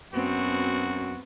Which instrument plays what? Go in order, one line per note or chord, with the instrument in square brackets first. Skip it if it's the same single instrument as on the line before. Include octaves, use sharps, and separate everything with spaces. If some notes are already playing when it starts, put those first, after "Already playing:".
[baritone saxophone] F#2 [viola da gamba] B3 C4 [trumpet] F#4